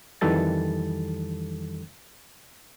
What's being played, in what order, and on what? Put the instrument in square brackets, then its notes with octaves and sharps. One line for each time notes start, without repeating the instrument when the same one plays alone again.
[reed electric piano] F2 D#3 E3 G3 A4 A6